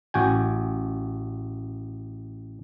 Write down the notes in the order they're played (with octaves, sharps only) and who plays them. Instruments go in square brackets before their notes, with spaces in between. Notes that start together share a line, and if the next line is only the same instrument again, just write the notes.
[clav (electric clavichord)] A1 F#4 G5 G#5